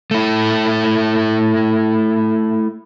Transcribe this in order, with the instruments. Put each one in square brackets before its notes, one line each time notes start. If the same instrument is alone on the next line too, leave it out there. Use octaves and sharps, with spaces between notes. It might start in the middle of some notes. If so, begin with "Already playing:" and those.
[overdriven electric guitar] A3 E4